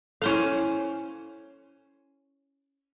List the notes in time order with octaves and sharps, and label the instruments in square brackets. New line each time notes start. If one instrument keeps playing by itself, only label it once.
[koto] C#4 C5 F5 [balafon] E4 A4